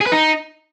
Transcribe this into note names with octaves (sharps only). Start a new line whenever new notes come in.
G#4
B4
D#4